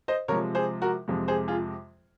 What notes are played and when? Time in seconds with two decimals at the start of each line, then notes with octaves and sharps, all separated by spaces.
0.08 C5 D#5
0.28 C3 F3 G#3 A#4 C#5
0.55 G#4 C5
0.82 F#4 A#4
1.08 F2 C3 F3 G#3
1.28 G#4 C5
1.48 F4 G#4